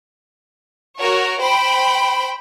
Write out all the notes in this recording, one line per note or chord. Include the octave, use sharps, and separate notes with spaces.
F#4 A#4 C#5
C5 G5 B5